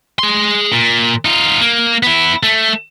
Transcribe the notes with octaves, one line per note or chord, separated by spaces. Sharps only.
G#4 C6
A#2
D#4 F4
A#3
B3 E4
A3